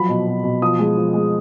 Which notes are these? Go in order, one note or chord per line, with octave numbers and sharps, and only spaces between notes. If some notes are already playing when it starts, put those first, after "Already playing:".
Already playing: F3 F#3 B5
B2
B2
B2
F3 D#6
G#3
F3
G#3